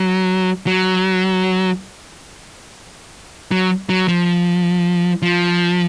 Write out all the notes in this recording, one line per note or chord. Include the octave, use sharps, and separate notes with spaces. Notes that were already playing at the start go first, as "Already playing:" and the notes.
Already playing: F#3
F#3
F#3
F#3
F3
F3